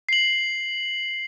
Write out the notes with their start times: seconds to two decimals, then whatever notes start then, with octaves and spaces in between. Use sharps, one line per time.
0.09 C7 F#7